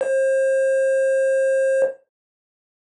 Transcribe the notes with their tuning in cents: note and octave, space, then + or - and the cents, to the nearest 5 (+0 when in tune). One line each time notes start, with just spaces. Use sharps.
C5 +35